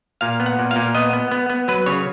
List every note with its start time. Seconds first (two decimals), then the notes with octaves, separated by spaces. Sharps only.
0.21 A#2 F5
0.40 B3
0.46 F#5
0.59 A#2
0.71 F5
0.76 A#2
0.95 B3 D#5
1.13 B3
1.31 B3
1.50 B3
1.68 F#3 B4
1.86 C#3 C#5